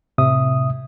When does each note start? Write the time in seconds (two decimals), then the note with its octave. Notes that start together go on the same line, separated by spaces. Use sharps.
0.18 A2 C3 E5 D#6